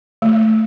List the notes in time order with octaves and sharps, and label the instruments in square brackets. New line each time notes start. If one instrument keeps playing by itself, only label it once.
[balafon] A3